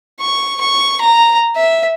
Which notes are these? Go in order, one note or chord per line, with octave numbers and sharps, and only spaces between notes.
C#6
C#6
A#5
E5